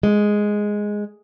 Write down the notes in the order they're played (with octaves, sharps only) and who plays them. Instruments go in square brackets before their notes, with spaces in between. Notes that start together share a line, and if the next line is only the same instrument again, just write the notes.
[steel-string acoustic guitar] G#3